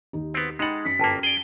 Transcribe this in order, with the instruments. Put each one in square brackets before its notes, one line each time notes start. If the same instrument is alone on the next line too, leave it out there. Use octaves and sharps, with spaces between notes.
[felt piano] D#2 D#4 G4
[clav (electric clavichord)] B3 C4 [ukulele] F#4
[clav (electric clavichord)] G#3 F#5 [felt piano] D#4 A6 [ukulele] G4 B5
[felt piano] F#2 C#7 [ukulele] C#4 [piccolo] B6
[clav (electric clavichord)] G1 A#3 [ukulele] G5 A5 A#5
[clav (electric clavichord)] G#4 D5 [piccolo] G7